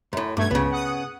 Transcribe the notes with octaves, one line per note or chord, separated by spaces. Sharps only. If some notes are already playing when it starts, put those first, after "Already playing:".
F#2 A2
B1 G2 A3 G#6
C#2 C#3 B3
F#5 D#6